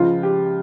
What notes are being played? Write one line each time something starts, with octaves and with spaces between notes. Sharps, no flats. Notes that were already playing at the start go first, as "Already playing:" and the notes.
Already playing: C#2 C#3 F3 F4
G4